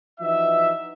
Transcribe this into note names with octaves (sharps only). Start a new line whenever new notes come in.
E3 F3 D#4 F#4 E5